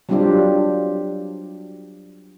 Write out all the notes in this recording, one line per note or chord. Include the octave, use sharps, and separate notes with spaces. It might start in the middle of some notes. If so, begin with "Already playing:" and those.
F#3 G3 C4 D4 F4 G4